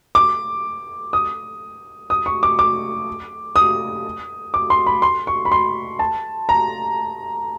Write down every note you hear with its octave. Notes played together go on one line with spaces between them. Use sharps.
D6
D#6
D#6
C#6
D6
D6
D#6
D6
C6
B5
C6
C#6
B5
C6
A5
A#5